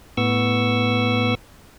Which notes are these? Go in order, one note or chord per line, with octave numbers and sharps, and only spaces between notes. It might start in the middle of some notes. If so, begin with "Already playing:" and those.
A2 B3 C#6 E6